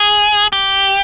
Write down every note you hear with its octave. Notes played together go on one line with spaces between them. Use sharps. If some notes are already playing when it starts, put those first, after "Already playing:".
Already playing: G#4
G4